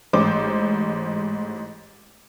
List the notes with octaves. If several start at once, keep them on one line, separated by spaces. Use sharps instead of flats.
A1 G#2 C5 D6